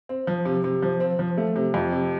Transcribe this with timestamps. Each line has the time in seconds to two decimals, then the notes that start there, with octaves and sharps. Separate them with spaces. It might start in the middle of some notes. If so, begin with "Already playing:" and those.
0.09 C4
0.27 F3
0.45 C3
0.64 C3
0.82 F3
1.00 C4
1.19 F3
1.38 A3
1.56 C3
1.74 F2
1.92 C3